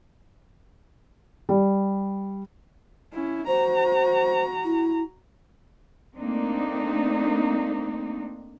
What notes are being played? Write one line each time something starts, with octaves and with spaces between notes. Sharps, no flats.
G3
C#4 E4
F#4 C5 A#5
E4
A3 A#3 C4 D4 D#4